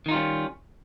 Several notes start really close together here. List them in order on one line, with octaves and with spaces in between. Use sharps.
D#3 D#4 F4 G3 C#4